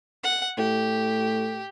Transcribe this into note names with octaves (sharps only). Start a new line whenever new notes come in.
F#5
A2 G4